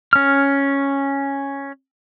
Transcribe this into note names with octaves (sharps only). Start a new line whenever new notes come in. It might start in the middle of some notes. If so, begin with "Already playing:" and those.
C#4 F6